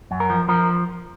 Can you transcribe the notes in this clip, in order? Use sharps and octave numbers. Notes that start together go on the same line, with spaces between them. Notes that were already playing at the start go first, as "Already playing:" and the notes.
F#2
A#4
F3
F3 A#4